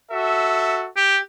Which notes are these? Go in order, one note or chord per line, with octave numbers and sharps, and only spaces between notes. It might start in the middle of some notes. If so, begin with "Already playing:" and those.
F#4 A4 E5
G4